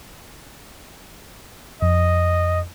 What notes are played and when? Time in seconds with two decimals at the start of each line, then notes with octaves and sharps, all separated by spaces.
1.82 F2 D#5